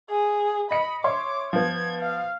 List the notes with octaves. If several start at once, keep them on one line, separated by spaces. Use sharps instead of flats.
G#4
D#5 B5 C#7
C#5 E5 C6 D6
F3 B3 G#6
F5